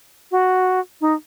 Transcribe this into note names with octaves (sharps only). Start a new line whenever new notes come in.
F#4
D#4